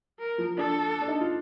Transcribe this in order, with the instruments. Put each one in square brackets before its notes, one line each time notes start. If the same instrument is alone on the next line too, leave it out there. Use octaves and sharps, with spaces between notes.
[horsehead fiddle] A#4
[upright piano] F3
[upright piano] D4 [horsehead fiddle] A4
[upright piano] D4
D#4
F4